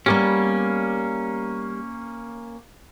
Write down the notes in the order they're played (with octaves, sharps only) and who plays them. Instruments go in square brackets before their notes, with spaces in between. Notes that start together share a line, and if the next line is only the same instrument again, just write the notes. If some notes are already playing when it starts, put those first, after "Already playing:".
[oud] G3 B3 G4 [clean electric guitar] A#3 C#4